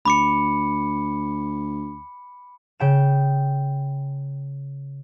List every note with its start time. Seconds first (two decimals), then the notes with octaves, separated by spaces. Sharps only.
0.05 D2 B5 D6 C#7
2.80 C#3 G5 E7